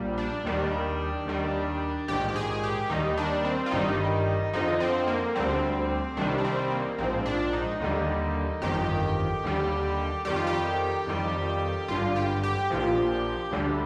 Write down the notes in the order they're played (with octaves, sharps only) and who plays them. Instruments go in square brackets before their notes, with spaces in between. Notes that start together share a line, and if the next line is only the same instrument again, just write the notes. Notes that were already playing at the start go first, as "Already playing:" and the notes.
Already playing: [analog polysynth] A#1 A#2 G3
D4
D#2 D#3 G3
D#2 D#3 G3
A#1 G#2 D#3 G4
G4
G#4
G4
D#2 D#3 G3 D#4
D4
C4
F4
G1 G2 D#3 G3 D#4
F2 D3 F3 D#4
C4
A#3
D2 D3 G3 C4
C2 C3 D#3 G3 D4
D4
C4
A#3
A#1 G#2 F3 C4
D4
D#4
D#2 D3 G3
G1 F2 D#3 G4
D#2 D3 G3
F2 D#3 G3 G4
F4
G4
F2 D#3 G3
G#1 G2 D3 F4
G4
G4
A#1 A#2 F3
D2 D3 G3